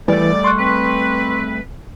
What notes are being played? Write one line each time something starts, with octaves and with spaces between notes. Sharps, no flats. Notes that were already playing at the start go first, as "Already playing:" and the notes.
E3 G3 A3 D5
C6 C#6 F#6
C4 B4